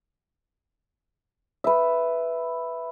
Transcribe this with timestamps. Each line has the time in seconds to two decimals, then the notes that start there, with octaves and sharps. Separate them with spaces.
1.64 B4 E5